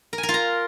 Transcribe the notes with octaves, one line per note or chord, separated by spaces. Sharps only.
A#4
G#5
A#4
F4
A#5